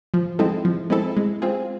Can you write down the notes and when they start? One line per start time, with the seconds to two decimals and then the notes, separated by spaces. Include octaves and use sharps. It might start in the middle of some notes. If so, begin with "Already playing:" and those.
0.14 F3
0.39 G#3 C4 E4 A4
0.65 F3
0.90 G#3 C4 E4 A4
1.17 G#3
1.42 C4 F4 G#4